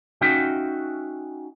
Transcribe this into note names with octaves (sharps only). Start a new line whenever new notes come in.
C#4 D#4 F#4 E5 F5 G5